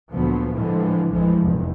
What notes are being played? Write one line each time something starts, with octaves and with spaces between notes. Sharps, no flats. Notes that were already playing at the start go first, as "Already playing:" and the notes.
D2 A#2 F3 F#3 B3
A2 D3 E3 F3 G#3
A1 F2 E3 F3 G#3
F1 B1 E2 G#2